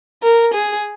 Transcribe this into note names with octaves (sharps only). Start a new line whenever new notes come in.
A#4
G#4